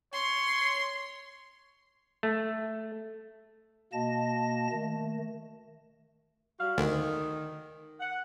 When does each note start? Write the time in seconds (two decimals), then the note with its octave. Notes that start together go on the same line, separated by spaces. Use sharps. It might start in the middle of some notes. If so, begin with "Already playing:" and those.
0.13 C#5 C6
2.23 A3
3.93 B2 A#3 D#5 A5 A#6
4.72 D#3 A3
6.60 G3 F#4 F5
6.78 D2 D#3
8.00 F#5